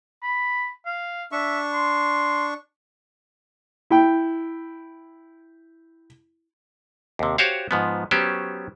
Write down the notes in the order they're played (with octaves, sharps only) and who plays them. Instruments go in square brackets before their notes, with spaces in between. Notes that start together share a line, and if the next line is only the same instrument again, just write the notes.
[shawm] B5
F5
[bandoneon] D4 C#6 [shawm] E5
[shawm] C6
[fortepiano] E4 G5
[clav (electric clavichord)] D#2 C3
F#4 G4 C5 C#5 F5
G#2 F3 B3
F#3 B3 C#4 G4 C5